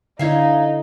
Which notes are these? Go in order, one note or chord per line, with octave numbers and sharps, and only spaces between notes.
D3 D#4 E4 C#5 E5 F5